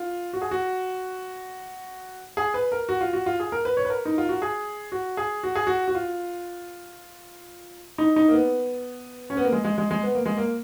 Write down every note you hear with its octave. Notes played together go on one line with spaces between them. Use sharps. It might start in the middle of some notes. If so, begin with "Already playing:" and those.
Already playing: F4
F#4
G#4
F#4
G#4
B4
A#4
F#4
F4
F#4
F4
G#4
A#4
B4
C#5
B4
A#4
D#4
F4
F#4
G#4
F#4
G#4
F#4
G#4
F#4
F#4
F4
D#4
D#4
A#3
B3
C#4
B3
A#3
G#3
G#3
G#3
G#3
B3
A#3
G#3
A#3